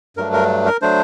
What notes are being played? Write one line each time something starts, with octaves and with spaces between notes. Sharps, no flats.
G2 F#3 A3 D4 A#4
A#4
A#4
F#3 A3 D4 C5